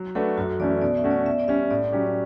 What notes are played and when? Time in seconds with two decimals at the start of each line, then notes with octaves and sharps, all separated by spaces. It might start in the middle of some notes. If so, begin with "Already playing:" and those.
Already playing: F#3
0.15 A3 D4 F#4 A4 B4
0.37 F#2 F#4
0.60 E3 A3 C#4 D5
0.81 B2 D5
0.97 E5
1.04 A3 C#4 F#4
1.11 D5
1.26 B2 E5
1.39 D5
1.48 G3 C#4 E5
1.71 A2 D5
1.93 F#3 C#4 G4